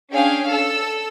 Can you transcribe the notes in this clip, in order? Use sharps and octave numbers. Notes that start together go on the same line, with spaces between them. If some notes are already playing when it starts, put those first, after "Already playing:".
C#4 D4 G#4 F5 G5
A4 E6